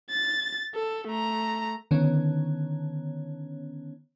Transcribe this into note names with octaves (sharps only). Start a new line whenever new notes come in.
A6
A4
A3 A#5
D3 D#3 B3 C#4 C#5